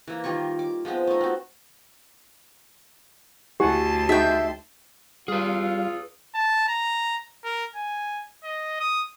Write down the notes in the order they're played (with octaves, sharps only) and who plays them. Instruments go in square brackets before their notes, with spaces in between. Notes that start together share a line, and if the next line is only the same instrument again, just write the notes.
[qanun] E3 A#3
D#3 G3 F4 C#6
D6
F3 G#3 B3 C4
A3 D#4
C4 F#4
[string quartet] D2 A5 C6 [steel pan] E4 F#5 G#5 [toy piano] G4
[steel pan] D#4 F#4 G#4 [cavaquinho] E5 G5
[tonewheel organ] G3 F5 [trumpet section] F4 [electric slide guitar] G#4 B4
[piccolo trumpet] A5
A#5
A#4
G#5
D#5
D#6